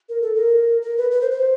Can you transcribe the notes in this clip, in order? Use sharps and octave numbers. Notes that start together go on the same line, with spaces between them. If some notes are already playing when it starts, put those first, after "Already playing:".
A#4
A4
A#4
A#4
B4
B4
C5
C5